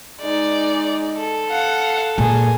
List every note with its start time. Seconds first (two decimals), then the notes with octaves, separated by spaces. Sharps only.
0.22 G#3 D#4 D5
1.18 A4
1.49 F5 F#5
2.18 A#2 G#4 A#4